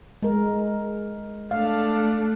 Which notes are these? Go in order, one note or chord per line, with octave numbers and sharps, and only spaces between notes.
G#3 A#4
A3 D4 F5